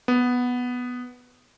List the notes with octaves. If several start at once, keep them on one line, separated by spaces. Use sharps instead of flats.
B3